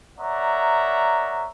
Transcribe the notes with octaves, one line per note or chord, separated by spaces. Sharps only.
A#4 C#5 D5 E5 F#5 A#5